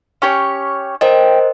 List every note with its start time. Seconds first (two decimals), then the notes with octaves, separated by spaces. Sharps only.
0.22 C#4 G4 C#5
1.01 A#4 C5 D#5 G5